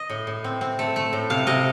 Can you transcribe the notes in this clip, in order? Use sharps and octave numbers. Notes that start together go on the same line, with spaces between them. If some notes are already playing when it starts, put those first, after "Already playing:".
Already playing: D#5
A2
A2
C4
C4
A3
A3
A2
C3 F5
C3 D#5